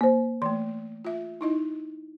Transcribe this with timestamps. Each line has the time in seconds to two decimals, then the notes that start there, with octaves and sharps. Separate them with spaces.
0.01 A#3 C5
0.42 E3 A3 C6
1.05 F4 E5
1.41 D#4 E4 D#5